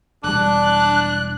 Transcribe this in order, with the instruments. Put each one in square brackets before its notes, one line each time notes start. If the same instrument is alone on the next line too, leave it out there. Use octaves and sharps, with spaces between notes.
[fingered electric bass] E1 G3 [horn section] D4 [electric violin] F#6